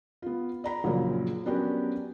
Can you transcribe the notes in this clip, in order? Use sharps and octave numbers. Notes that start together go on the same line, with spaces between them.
B3 F4
D5 A#5 B5
A#1 F#2 C#3 A#3
F#3 B3 C#4 D4 G4 A#4